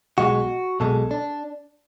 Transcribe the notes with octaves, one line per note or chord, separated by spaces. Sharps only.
B1 B2 G#3 F#4
B1 B2 G#3 A4
D4